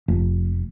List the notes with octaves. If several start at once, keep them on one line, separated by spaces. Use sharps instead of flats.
F1